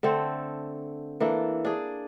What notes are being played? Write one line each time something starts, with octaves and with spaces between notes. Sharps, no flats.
D3 A3 C4 A4
E3 A#3 D4 A4
D4 G#4